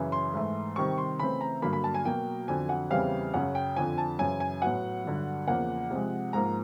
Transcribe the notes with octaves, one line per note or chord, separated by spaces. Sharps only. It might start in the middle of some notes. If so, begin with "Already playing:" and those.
Already playing: F#2 C#3 E3
C6
G#2 E3 A3
C3 D#3 G3 C4 C#6
C6
C#3 E3 A3 C4 B5
A#5
G2 D3 F#3 A#3 B5
B5
A5
G#5
B2 F#3 A#3 G5
F2 D3 F#3 G#5
F#5
E2 C#3 E3 G3 C4 F5
F#2 C#3 F#3 F#5
G5
F2 D3 F3 G#5
A5
F#2 C#3 E3 G#5
G#5
A2 F#3 B3 F#5
G2 D3 F#3
E2 C#3 F3 A#3 F#5
C3 F3 G#3
G#2 F3 A#3 A#5